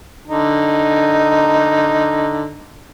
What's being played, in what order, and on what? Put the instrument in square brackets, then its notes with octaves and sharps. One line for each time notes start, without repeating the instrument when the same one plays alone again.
[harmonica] D3 D#4